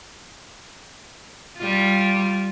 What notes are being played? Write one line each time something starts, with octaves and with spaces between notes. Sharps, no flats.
G3 F4